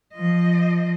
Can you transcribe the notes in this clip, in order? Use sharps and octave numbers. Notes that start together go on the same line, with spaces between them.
F3 D#5